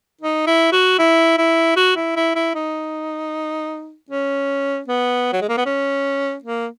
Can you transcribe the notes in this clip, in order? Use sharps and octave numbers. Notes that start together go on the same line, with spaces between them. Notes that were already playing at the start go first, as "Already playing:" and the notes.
D#4
E4
F#4
E4
E4
F#4
E4
E4
E4
D#4
C#4
B3
F#3
G#3
A#3
B3
C#4
A#3